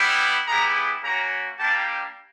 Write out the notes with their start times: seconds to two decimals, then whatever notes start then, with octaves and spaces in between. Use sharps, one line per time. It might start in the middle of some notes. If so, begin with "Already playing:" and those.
Already playing: G3 B3 E4 G4
0.47 G#3 B3 E4 G4 A#5
1.03 A#3 C#4 F#4 A#5
1.58 G3 A#3 D4 G4 A5